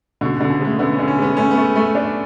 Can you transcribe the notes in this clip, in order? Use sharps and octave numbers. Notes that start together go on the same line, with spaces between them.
B2 D3
B2
D3
C#3
G#3 A3
D3 B3
C#4
D3
C#4
G#3 B3
A3 C#4
B3
A3
A3
D4